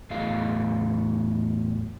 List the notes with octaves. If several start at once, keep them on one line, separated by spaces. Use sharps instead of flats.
E2 A2 F#3 G#4 D#5 F5